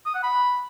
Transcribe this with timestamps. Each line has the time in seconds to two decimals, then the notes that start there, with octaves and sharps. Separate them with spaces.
0.06 D#6
0.14 F#5
0.23 B5